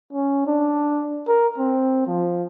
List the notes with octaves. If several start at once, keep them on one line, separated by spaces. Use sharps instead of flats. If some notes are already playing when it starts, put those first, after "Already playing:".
C#4
D4
A#4
C4
F3